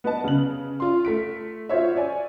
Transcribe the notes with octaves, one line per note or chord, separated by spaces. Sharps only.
B3 B4 D#5 A5
C#3 F#7
F4 C6
A3 B6 D7
F4 F#4 C5 C#5 E5
C#5 D5 G#5